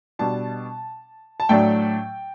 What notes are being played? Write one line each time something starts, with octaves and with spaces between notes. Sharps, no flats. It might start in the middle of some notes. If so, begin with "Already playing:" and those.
B2 G3 D4 A5
A5
A2 F#3 A3 D4 G5